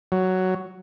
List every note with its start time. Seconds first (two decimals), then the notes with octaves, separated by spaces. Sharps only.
0.12 F#3